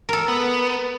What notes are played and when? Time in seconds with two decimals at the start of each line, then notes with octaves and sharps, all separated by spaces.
0.09 A4 A#4
0.28 B3